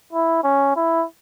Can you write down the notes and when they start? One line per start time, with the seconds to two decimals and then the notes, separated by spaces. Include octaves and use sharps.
0.13 E4
0.44 C#4
0.76 E4